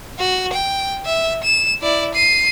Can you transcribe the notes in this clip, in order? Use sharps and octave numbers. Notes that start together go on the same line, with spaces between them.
F#4
G5
E5
E7
E4 D5
C7 D#7